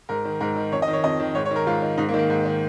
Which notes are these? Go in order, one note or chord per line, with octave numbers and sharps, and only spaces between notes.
G#2 A#4
D#3
G#2 A#4
D#3
F2 C#5
D#5
D#3
C#5
F2 D#5
D#3
G#2 C#5
C#5
D#3
A#4
G#2 F4
D#3
G#2 D#4
A#3
D#3
A#3
G#2
D#3